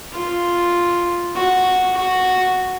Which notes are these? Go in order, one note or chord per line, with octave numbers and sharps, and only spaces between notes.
F4
F#4
F#4